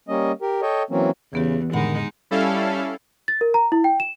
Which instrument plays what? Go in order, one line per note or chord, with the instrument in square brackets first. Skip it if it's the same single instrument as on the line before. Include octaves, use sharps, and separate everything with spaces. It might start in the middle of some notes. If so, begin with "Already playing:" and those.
[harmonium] G3 A#3 C#4 D#5
G4 A#4
A4 C#5 D#5 G5
E3 F#3 A#3 C4 C#4
[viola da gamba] E2 [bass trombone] C#3 [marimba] E3 B3 G4
[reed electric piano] F2 A2 D3 [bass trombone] D#3 [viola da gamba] G#3 D#4 [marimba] F#5 B5
[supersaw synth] G3 C#4 E4 A4 F5
[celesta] A6
A#4
A#5
E4
G5
E7